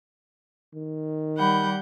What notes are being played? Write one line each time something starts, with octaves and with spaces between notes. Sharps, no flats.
D#3
G3 F#5 B5 G6